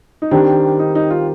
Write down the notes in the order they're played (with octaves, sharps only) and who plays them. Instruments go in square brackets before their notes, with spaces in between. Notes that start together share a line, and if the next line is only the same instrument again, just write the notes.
[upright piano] D#4
[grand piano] D#3 G3 C4 G4 A#4 [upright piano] D4
[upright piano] D#4
D#4
F4